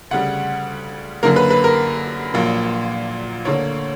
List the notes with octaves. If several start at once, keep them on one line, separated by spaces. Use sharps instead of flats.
D2 C#3 G3 F#5
F#2 D3 F#3 A#3 A#4
B4
B4
A#4
A#1 A#2 F#3 A#3
D2 D3 A#3 C#5